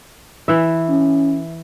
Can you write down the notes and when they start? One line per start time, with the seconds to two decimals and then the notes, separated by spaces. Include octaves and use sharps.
0.48 E3 E5
0.89 C#4